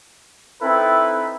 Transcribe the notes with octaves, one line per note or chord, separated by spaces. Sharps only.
C4 D#4 E4 A4 B4